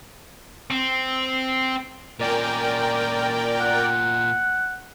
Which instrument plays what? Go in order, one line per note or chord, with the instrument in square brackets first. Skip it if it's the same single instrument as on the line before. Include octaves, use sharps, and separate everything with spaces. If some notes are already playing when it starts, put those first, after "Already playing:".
[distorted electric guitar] C4
[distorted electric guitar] A#2 C#4 [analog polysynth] A#4 D5 G5
[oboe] F#5